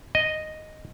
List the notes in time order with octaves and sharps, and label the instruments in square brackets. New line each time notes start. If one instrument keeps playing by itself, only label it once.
[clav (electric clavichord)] D#5